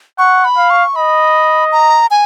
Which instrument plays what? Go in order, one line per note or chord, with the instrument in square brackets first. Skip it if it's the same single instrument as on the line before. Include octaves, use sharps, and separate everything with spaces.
[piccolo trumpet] F#5 [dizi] C#6
[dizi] B5
[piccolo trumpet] F5
[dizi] C#6
[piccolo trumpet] D#5 [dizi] B5
[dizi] A#5
G#5